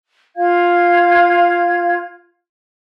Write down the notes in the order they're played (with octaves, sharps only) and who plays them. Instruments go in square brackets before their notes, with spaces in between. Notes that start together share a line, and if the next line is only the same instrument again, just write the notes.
[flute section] F4 F5 G#6